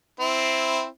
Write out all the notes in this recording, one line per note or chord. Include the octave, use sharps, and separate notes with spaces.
C4 E4